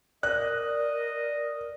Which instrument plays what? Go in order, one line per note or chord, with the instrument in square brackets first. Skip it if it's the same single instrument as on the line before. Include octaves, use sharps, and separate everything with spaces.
[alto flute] A#4 [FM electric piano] D5 [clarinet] D#5 [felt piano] F#6